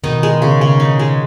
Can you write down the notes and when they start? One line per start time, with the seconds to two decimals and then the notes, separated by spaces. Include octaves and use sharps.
0.04 B2 D#3 D#4
0.23 G#3
0.42 C#3
0.61 C#3
0.80 D#4
0.99 G#3